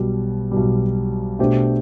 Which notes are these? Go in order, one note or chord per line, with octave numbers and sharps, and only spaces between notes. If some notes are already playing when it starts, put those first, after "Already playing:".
Already playing: B1 B2 G3
B1 B2 G3
B2 A3 D4 G4 C5